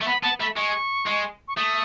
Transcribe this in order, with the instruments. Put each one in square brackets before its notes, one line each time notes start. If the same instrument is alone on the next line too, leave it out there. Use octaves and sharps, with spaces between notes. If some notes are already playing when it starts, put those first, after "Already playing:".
[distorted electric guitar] A3
[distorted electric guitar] B3 [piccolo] B5
[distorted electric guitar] B3 [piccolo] A5
[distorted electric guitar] A3 [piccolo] B5
[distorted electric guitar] G#3 [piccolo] C#6
[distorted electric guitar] G#3
[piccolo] C#6
[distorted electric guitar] A3 [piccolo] D#6